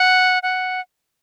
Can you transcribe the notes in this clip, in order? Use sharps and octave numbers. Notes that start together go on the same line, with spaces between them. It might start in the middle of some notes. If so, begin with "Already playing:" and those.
Already playing: F#5
F#5